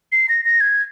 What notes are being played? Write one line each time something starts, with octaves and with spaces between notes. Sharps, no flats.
C7
A#6
A#6
G#6